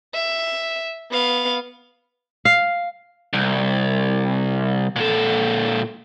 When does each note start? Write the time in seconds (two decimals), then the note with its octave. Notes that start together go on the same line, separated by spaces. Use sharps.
0.14 E5
1.11 B3 F5
2.45 F5
3.33 C2
4.96 A#2 A4